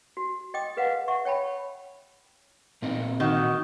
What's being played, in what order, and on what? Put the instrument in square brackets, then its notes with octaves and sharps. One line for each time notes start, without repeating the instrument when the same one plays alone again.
[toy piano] F#4
D#5 G5 D6 D#6
G#4 B4 F5 F#5
E5 F#5 C#6
C#5 G5 A5 B5
[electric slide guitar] A#2 C4 D#4
[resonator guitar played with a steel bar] D#3 [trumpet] F#4